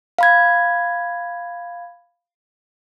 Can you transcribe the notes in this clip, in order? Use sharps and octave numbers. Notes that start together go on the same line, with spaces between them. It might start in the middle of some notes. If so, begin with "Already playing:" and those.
F5 B5 G#6